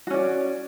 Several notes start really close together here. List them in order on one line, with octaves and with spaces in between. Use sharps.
F#4 C#4 D5